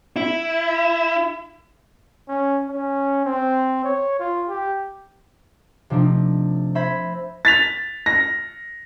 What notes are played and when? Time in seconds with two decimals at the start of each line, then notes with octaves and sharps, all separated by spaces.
0.16 E4
2.29 C#4
2.69 C#4
3.25 C4
3.84 C#5
4.20 F4
4.49 G4
5.90 C3 F3 A3 D4 D#4
6.75 C5 E5 B5 G#6 A#6 B6
7.45 A6 B6 F7
8.06 A#6